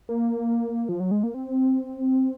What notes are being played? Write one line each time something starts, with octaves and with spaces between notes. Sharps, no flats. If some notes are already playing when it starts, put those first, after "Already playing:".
A#3
F3
F#3
G#3
A#3
C4